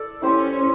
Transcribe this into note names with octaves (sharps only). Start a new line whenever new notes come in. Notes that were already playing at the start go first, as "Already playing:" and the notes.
Already playing: A4 D5
C#4 E4 G4 C5